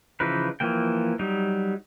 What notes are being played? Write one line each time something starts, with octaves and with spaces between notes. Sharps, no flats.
C#3 E3 F3 D#4 B4
E3 F3 A#3 G5
F#3 G3 D#4